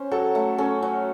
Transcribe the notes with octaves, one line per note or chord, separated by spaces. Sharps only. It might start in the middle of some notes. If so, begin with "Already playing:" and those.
Already playing: C#4 C5
F#3 A4
A3
C#4 A4
F#3